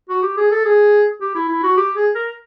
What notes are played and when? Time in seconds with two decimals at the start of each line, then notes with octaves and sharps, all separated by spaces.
0.09 F#4
0.22 G4
0.37 G#4
0.51 A4
0.65 G#4
1.21 G4
1.35 E4
1.48 E4
1.63 F#4
1.77 G4
1.96 G#4
2.15 A#4